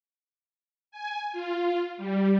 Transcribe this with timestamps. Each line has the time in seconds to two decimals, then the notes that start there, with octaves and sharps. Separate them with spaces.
0.91 G#5
1.33 F4
1.97 G3